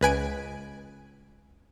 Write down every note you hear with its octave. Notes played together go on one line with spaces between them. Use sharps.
C#2 B4 G#5 D7